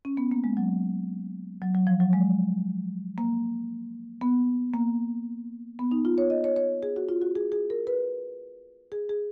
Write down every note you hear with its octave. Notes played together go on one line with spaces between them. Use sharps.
C#4
B3
A#3
G#3
F#3
F#3
F#3
F3
F#3
G#3
A#3
B3
A#3
B3
D#4
F4
C#5
D#5
C#5
C#5
G#4
F#4
F4
F#4
G#4
G#4
A#4
B4
G#4
G#4